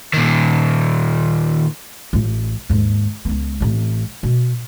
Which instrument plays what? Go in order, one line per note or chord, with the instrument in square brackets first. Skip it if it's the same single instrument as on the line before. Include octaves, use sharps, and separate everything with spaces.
[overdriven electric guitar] A#2 D#3
[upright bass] A1 F4
D#2 G#2
C#2 B3
A1 C4
B2